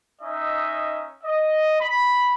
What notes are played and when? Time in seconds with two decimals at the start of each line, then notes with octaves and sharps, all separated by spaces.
0.21 C#4 D#4 D#5 E5
1.24 D#5
1.81 B5